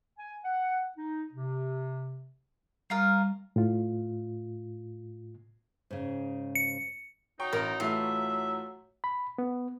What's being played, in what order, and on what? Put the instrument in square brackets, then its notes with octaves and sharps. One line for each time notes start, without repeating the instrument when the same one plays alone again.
[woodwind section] G#5
F#5
D#4
C3
[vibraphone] G3 [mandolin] D#4 F4 A#4
[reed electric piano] A2 F4
[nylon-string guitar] G#2 C#3
[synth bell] C#7
[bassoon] F#3 [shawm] D#4 [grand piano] G5 C#6
[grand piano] A1 [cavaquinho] A#4
[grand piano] A2 E3 A3 [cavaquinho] F4 [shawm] E5
[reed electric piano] B5
B3